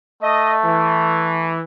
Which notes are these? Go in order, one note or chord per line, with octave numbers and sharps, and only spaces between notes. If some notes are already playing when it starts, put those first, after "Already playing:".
A3 D#5
E3